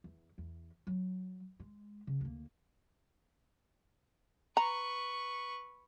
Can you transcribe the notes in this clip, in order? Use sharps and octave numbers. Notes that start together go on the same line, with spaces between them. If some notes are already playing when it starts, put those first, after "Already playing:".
E2
E2
F#3
G#3
C#3
D2 A#3
B4 A#5 B5 C#6